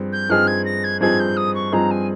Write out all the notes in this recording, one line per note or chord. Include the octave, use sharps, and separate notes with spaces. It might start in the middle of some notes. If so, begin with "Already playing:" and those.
Already playing: G2 F3 C4 G#4
G6
G2 F3 C4 D#4 G#4 F6
G#6
A#6
G#6
G2 F3 C4 D#4 G#4 G#6
G6
D#6
C#6
G2 F3 C4 D#4 G#4 A#5
G#5